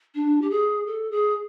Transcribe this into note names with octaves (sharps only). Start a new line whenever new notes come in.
D4
G4
G#4
A4
G#4